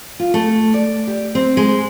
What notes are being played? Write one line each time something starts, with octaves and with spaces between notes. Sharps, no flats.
F4
A3
D5
G4
C4
G#3